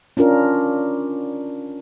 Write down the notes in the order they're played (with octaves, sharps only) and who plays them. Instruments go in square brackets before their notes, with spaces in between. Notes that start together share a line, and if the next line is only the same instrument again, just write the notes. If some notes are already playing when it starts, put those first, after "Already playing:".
[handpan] C#4 D4 F4 A#4